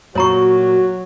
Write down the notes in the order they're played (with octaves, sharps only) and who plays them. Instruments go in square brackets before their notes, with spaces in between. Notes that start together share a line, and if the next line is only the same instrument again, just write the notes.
[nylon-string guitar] A#2 [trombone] F#3 [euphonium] F#4 [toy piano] C#5 A#5 C#6